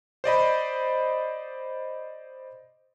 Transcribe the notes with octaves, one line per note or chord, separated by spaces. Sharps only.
C5 D5 D#5 B5